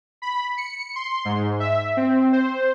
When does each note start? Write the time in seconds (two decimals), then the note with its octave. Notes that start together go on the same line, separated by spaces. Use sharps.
0.22 B5
0.57 C#7
0.96 C6
1.25 G#2
1.60 E5
1.97 C4
2.32 C5